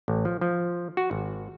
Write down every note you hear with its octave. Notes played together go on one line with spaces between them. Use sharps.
A1
F3
F3
F#4
G#1